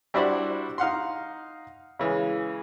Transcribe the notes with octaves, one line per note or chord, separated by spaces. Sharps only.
G3 D4 E4 F#4 C5 D5
D#4 F5 F#5 C6
C#3 E3 G#3